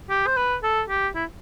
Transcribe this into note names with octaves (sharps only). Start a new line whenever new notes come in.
G4
C5
B4
A4
G4
E4